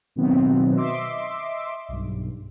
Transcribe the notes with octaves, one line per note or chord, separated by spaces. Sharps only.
B2 D#3 F#3 B3 C4
D#5 E5 C6 D6
B1 G2